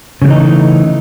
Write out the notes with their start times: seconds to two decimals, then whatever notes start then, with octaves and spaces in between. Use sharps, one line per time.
0.22 C#3
0.24 G3
0.27 E3
0.30 D#4
0.33 A3